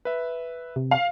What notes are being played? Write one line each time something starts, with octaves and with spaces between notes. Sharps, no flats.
B4 E5
C3
F5